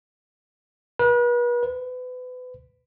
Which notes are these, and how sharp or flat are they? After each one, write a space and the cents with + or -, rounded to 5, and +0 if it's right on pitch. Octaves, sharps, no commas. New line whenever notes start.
B4 -40
B4 +30